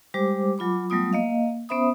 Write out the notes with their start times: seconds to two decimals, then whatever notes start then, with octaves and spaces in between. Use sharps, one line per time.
0.14 G3 G#3 G4 C5 D6
0.58 F#3 F4 B5 D6
0.90 F#3 G3 A3 B3 F4 D#6
1.13 A#3 D#5 F5
1.69 B3 C#4 C5 E5 B5 D#6